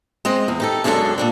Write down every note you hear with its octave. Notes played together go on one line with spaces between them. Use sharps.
G#3 C4 D#5
E2
D#4 G4 A4
F#2 B2 G#3 D4 E4 A4
A#2 G3 D4